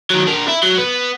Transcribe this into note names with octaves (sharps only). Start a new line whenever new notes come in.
D#3 F#3
D4 A#4
E4
F#3
B3